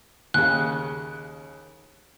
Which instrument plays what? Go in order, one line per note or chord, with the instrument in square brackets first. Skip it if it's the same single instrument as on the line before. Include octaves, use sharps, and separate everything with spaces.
[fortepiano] D#2 C#3 [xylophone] F#6